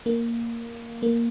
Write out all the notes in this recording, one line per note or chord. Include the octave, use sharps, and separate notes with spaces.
A#3
A#3